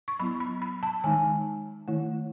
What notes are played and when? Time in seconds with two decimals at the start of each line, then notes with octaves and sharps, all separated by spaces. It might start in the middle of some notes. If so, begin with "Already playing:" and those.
0.08 C#6
0.19 F#3 B3 E4 B5
0.40 B5
0.62 B5
0.83 A5
1.04 D#3 G#3 D#4 G#5
1.88 D#3 A3 E4